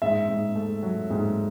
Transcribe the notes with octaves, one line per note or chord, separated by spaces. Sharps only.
G#2 E5
G#2
A3
F#3
G#2